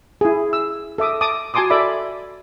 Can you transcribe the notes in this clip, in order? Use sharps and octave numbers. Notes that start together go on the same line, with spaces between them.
E4 G#4
E6
A4 E5 D6 D#6
A5 D6 D#6
F#4 G#5 A5 C6 D6 D#6
A4 D5 E5 B5 D6